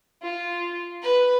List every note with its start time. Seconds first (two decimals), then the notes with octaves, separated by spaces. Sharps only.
0.22 F4
1.02 B4